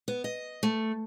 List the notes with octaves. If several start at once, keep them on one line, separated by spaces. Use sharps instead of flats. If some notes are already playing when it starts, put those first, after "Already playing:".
B3
D#5
A3